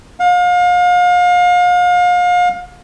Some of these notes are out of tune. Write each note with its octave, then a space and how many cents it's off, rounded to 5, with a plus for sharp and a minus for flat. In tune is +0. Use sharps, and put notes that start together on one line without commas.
F5 +35